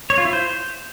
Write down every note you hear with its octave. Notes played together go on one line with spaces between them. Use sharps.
C#5
F4
E4
C5